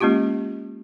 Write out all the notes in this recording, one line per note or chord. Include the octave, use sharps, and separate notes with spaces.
G#3 A#3 C#4 F4 G4